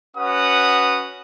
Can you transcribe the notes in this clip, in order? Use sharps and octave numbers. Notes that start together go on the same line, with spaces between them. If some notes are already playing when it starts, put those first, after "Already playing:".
C#4 F#4 B4 F#5 D#6